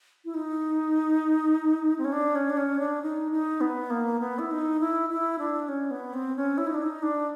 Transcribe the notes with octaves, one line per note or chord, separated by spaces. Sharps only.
E4
D#4
C4
C#4
D4
C#4
D4
C#4
D4
D#4
D#4
B3
A#3
B3
E4
D#4
E4
E4
D4
C#4
B3
C4
C#4
E4
D#4
D4
D#4
D4